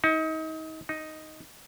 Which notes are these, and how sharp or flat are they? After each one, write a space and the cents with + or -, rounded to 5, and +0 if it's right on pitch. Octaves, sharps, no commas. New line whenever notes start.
D#4 +30
D#4 +0